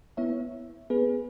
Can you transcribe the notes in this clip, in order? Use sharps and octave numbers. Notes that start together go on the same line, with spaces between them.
B3 E4 C#5 E5
B3 G#4 B4